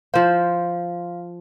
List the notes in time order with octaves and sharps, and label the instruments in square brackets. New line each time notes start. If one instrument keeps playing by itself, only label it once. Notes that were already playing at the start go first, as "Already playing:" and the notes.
[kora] F3 C5 [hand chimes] F5